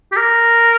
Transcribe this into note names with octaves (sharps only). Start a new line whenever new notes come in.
G4
A#4